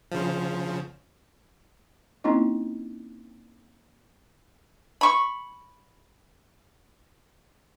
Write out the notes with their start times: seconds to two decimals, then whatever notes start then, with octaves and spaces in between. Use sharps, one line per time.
0.12 C#3 F3
2.24 A#3 C4 C#4 D#4 E4 D#5
5.01 B5 C#6